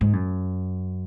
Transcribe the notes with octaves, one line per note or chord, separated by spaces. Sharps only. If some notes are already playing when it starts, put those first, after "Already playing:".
G#2
F#2